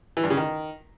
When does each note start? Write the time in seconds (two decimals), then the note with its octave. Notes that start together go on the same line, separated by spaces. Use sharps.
0.17 E3
0.24 G2
0.30 C#3
0.37 D#3